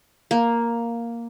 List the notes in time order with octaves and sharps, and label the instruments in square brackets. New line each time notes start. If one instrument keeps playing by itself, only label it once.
[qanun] A#3